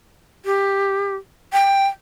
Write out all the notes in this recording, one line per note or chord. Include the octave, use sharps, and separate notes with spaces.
G4
G5